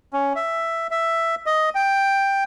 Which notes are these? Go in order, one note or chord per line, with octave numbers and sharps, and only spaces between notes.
C#4
E5
E5
D#5
G5